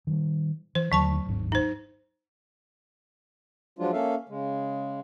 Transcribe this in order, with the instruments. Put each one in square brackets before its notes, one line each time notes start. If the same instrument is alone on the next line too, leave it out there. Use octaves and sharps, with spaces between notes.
[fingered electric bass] D#3 F3 G3
[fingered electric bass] E3 [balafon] C5
[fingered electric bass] D#2 D3 A3 [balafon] F#3 A5 C#6
[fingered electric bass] G1 D#2 G#2
[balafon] D#4 C5
[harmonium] F3 F#3 G#3 D4 F4
A#3 C#4 A4 E5 F5
C#3 G#3